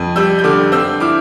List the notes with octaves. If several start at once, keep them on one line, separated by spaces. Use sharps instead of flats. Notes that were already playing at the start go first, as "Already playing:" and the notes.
Already playing: F2
G3 E6 G6
G6
D3 D6 F6
C4 E6 G6
E4 D6 F6